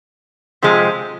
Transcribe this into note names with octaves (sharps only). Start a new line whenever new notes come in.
C3 F3 G#3